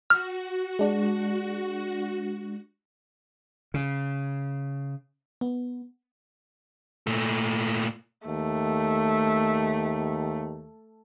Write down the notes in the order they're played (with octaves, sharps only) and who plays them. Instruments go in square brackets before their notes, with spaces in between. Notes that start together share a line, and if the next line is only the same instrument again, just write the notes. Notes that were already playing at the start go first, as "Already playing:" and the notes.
[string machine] F#4 [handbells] F6
[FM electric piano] G#3 D4
[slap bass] C#3
[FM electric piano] B3
[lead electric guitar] A#2 A3
[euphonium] D#2 [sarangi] A3